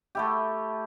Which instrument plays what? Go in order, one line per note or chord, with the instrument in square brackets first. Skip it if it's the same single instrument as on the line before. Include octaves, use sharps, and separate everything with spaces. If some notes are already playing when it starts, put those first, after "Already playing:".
[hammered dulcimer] A3 E4 G4